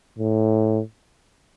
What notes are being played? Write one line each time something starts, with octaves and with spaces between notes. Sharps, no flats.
A2